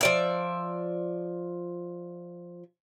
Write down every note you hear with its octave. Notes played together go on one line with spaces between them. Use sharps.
F3 D5 E5